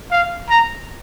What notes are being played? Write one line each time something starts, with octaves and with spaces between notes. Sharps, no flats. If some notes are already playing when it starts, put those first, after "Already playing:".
F5
A#5